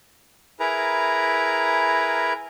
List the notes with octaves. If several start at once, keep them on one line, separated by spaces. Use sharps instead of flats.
E4 G#4 A#4 B4 A#5